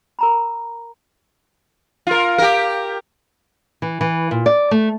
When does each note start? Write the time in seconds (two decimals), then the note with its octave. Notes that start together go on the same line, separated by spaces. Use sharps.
0.19 A#4 A#5 B5
2.07 F4 A#4
2.38 G4 A#4
3.82 E3
4.01 E3
4.31 A#2
4.46 D5
4.71 A3